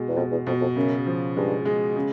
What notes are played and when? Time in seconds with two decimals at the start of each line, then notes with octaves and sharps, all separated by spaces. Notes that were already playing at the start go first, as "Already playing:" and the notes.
Already playing: B2 G#3
0.08 E2
0.17 F2 B2
0.31 E2
0.47 F2 B2
0.61 F2
0.76 F#2 C#3
1.07 F3
1.37 G2 G#3
1.65 G#3
1.96 C#3